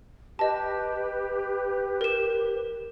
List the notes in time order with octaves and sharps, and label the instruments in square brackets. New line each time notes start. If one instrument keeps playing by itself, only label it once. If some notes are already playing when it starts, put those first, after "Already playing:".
[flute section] G4 B4 [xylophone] D#5 A5
[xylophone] A#4 E7